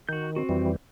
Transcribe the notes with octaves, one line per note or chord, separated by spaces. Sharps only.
D#3 F#4 G6
C4 F#4
F2 E3 G3